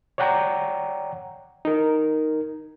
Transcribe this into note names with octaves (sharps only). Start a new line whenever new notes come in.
C#5 D5 F#5 G5 A#5
D#4 A#4